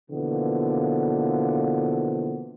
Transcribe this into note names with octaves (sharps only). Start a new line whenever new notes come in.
B2 D3 E3 F3 A#3 B3